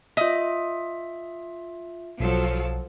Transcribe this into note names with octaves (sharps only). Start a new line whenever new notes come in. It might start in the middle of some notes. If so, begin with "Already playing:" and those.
F4 D#5 E5
B1 F3 F#3 A4